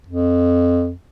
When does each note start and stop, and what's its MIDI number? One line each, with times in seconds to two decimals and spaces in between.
0.07 0.93 41